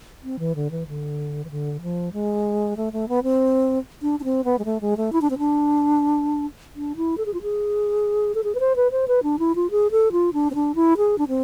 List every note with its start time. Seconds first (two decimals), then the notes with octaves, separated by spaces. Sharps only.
0.24 C4
0.39 E3
0.55 D3
0.71 E3
0.88 D3
1.45 E3
1.51 D3
1.82 F3
2.13 G#3
2.77 A3
2.93 A3
3.09 B3
3.23 C4
4.02 D4
4.20 D4
4.24 C4
4.44 B3
4.59 G#3
4.65 A3
4.81 G#3
4.97 A3
5.13 E4
5.21 D4
5.30 C4
5.38 D4
6.76 D4
6.97 E4
7.18 A4
7.26 G#4
7.34 F4
7.42 G#4
8.35 A4
8.44 G#4
8.55 B4
8.60 C5
8.76 B4
8.91 C5
9.08 B4
9.23 D4
9.39 E4
9.55 F4
9.71 G#4
9.91 A4
10.12 F4
10.33 D4
10.51 C4
10.55 D4
10.75 E4
10.97 G#4
11.18 D4
11.28 C4